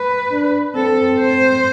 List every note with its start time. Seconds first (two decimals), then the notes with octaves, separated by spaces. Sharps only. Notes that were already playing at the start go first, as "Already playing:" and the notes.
Already playing: B4
0.31 D4
0.75 C4 A4
1.19 C5